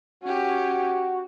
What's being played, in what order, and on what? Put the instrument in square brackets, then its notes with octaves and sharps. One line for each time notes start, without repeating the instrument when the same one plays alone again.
[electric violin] C#4 G4 [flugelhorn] F#4